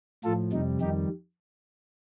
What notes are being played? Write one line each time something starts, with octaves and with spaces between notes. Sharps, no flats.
A2 F3 F4 A4
F2 C3 G3 D#4
F2 D#3 G3 D#4 G4